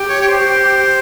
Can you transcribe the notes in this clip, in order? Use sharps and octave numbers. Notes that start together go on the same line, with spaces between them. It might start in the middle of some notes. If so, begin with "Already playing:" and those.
Already playing: G4
C#5
C#5
C5
G4